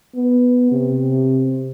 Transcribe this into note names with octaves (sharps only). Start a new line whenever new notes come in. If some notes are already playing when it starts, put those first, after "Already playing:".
B3
C3